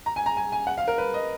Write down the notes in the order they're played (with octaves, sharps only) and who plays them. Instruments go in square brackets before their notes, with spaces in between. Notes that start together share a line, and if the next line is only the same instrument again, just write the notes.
[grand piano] A#5
G#5
A#5
G#5
G#5
F#5
F5
A#4
B4
D#5